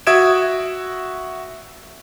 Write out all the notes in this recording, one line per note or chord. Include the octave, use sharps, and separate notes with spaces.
F#4 E5 D#6 G#6 D7 E7